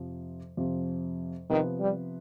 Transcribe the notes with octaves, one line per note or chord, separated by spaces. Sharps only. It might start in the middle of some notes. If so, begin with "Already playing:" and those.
Already playing: F2 C3 F3
F2 C3 F3
C3 D#3 F3 B3 F4 B4
G3